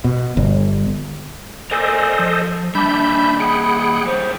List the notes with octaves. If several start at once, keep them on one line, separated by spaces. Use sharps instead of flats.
B2
G1
A4 A#4 C5 D5 D#5 G#5
F3
G3 A#3 D4 E5 B5 G6
G#4 F#5 G5
G3 G#4 C5 C#5